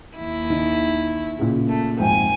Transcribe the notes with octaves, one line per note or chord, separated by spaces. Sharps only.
D#2 E4
D#3
A#2 C#3
A3
G#1 F2 G5 G#5